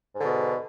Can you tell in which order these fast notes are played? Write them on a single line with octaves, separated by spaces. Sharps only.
G#2 D3 B2